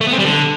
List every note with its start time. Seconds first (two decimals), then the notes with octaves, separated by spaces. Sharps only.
0.01 A3
0.07 B3
0.13 C4
0.19 G3
0.25 D3